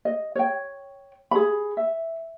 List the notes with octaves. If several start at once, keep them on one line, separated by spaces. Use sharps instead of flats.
D#5
C#5 G5
G#4 B5
E5